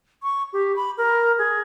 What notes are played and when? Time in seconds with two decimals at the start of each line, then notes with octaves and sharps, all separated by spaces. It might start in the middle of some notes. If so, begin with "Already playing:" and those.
0.23 C#6
0.53 G4
0.76 B5
0.98 A#4
1.38 G#4